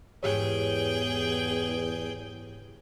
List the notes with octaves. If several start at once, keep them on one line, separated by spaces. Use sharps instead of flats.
E2 G#2 G4 G#4 C#5 G5